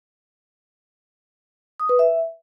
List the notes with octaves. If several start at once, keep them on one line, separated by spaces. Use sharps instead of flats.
D#6
B4
E5